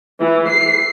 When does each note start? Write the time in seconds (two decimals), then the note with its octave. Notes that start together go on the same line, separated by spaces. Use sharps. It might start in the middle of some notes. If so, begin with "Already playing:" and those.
0.19 E3
0.49 C7